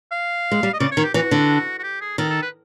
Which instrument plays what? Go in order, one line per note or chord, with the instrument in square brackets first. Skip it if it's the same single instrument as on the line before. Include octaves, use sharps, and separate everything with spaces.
[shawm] F5
[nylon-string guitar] G#3
G3
[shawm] D#5
[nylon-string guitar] C#3 [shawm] D5
[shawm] C#5
[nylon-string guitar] D#3
[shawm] G4
[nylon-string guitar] E3 [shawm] F#4
[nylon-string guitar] D3
[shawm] F#4
G4
G#4
[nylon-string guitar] D#3 [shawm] A4
[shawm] A4
B4